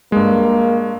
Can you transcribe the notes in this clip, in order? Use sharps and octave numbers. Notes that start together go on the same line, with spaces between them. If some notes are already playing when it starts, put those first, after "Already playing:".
G2 G#3 A#3